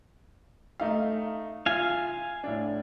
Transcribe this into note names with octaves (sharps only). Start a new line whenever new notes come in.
A3 D#4 F5
F4 E5 F5 G#5 F7
A2 D4